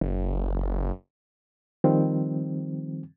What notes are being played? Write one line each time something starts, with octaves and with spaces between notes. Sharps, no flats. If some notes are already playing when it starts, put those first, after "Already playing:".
F#1
D#3 F3 G3 C4